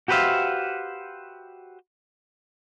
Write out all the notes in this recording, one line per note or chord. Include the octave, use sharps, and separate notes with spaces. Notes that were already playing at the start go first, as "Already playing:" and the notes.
F#4 G4 B4 C5 E5 F5